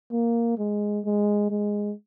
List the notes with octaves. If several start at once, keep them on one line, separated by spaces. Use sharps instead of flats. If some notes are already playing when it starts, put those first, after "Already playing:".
A#3
G#3
G#3
G#3